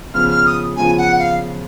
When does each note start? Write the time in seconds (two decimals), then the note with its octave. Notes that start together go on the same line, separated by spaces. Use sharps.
0.14 C#3 F3 B3 F4 F6
0.29 F6
0.46 D#6
0.76 C#3 F3 B3 F4 G#5
0.98 F#5
1.19 F5